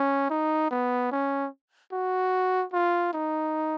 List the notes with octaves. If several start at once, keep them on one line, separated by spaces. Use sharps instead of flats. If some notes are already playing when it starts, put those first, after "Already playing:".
Already playing: C#4
D#4
B3
C#4
F#4
F4
D#4